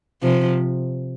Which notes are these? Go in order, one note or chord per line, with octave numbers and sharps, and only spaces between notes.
C3 F3